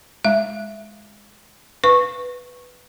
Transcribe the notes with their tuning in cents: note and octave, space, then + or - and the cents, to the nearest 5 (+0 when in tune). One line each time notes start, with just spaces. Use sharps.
G#3 +0 E5 +0
B4 +0 F5 +0 C#6 -15